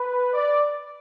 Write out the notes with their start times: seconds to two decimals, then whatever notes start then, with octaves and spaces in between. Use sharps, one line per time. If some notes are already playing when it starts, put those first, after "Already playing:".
Already playing: B4
0.34 D5